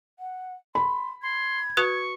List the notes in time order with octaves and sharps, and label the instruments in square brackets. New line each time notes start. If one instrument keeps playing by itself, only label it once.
[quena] F#5
[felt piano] B5 [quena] C6
[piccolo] C6 [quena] G#6
[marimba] F#4 B4 F#6 [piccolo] C#6